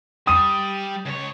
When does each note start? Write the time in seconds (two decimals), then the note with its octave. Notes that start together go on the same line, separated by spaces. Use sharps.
0.27 G3 D#6 D#7
1.06 C#2 C#5